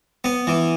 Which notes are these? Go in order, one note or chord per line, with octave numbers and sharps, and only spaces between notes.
B3
E3